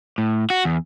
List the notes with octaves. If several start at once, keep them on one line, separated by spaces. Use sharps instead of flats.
A2
F#4
E2